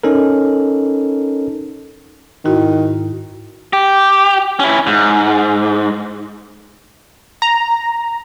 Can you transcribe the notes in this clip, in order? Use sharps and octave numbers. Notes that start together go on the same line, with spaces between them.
C#4 D#4 A4 A#4
G#2 D#3 E4 F#4
G4
C#4 E4
G#2
A#5